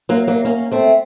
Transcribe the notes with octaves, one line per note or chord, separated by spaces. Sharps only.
F#3 A#3
F#3 A#3
A#3 C#4
A3 C4